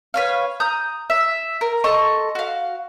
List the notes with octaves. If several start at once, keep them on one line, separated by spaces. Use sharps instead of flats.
B4 C#5 F5
A#5 D#6 G6
E5
A#4
A4 D#5 C6 C#6
F#4 F5